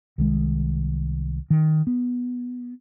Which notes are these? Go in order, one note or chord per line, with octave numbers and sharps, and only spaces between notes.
C2 D#3 G#3
D#3
B3